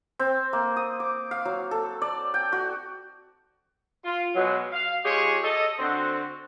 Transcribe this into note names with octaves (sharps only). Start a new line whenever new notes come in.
C4
A#3
D#6
D6
F5
F#3
A4
D5
G5
F#4
F4
B2 F#3 G#3
F5
G#3 F4 G4 G#4 C#5
A4 D#5
D3 C4 F#4